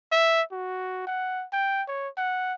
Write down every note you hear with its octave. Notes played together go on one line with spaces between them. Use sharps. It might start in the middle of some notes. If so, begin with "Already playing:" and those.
E5
F#4
F#5
G5
C#5
F#5